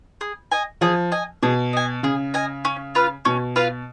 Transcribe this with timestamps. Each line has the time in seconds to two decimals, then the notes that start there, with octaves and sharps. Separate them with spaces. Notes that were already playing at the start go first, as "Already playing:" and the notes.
0.21 G#4
0.51 D#5 G#5
0.81 F3 G#4
1.12 D#5 G#5
1.43 B2 G#4
1.73 D#5 G#5
2.03 C#3 G#4
2.34 D#5 G#5
2.65 C#4
2.95 F4 B4 F5
3.25 B2 C#4
3.56 F4 B4 F5